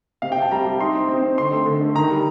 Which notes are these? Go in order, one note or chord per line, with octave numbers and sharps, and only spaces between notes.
C3 F5
G5
C3
A5
G3 A#5
G3
D#4 C6
C4
C4
C4
D3 C6
A3
D3
A3
D#3 A#5
G3